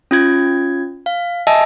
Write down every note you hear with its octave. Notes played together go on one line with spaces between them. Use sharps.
C#4 F4 G#6
F5
D#5 E5 G#5 A5 E6